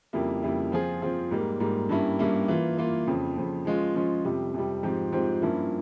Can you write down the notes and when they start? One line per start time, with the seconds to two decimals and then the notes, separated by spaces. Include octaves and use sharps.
0.13 F2 C#3 G3 A#3 E4
0.43 F2 C#3 G3 A#3 E4
0.72 F3 C4 F4 G#4
1.02 F3 C4 F4 G#4
1.31 G#2 G3 A#3
1.60 G#2 G3 A#3
1.89 G2 G3 A#3 C#4 E4
2.19 G2 G3 A#3 C#4 E4
2.48 E3 A#3 F4
2.77 E3 A#3 F4
3.07 F2 C#3 F3
3.36 F2 C#3 F3
3.65 F3 G#3 C#4 F4
3.95 F3 G#3 C#4 F4
4.24 F2 C3 G3
4.54 F2 C3 G3
4.83 G#2 F3 C4 G4
5.12 G#2 F3 C4 G4
5.42 G2 F3 A#3 C#4 E4